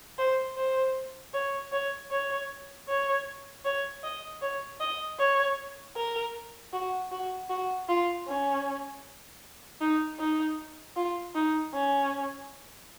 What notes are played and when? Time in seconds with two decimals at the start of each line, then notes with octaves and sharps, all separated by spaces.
0.18 C5
0.57 C5
1.33 C#5
1.72 C#5
2.11 C#5
2.88 C#5
3.65 C#5
4.03 D#5
4.42 C#5
4.80 D#5
5.19 C#5
5.96 A#4
6.73 F#4
7.11 F#4
7.50 F#4
7.88 F4
8.27 C#4
9.81 D#4
10.19 D#4
10.96 F4
11.35 D#4
11.74 C#4